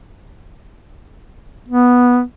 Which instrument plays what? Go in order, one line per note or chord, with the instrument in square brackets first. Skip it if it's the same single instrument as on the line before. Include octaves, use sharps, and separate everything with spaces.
[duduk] B3